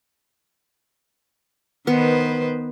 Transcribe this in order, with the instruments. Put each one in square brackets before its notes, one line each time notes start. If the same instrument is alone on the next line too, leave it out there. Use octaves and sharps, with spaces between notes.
[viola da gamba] D#3 B4 C5 [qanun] B3